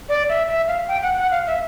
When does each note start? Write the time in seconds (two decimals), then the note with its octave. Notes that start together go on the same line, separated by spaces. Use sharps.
0.09 D5
0.29 E5
0.48 E5
0.68 F5
0.88 G5
1.03 F#5
1.17 F#5
1.31 F5
1.47 E5